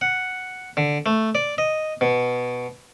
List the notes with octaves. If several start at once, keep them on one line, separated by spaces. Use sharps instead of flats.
F#5
D3
A3
D5
D#5
B2